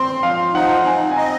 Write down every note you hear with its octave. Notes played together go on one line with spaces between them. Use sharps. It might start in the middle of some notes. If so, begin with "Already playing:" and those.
Already playing: C4 C6
F3 F5
D#4 F#5
C4 G#5
G#5
D#5 A#5